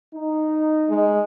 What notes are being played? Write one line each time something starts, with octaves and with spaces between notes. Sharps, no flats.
D#4
G#3